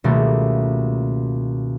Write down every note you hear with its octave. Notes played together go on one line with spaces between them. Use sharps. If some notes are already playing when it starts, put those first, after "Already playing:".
C#2 B2 D#3 G3 A3 A#3